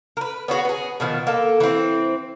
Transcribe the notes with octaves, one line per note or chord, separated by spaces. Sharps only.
A#4 B4
B3 C#4 F#4 G#4
B3 G#4
B2 D#3 F3
A#3 A4
E3 C4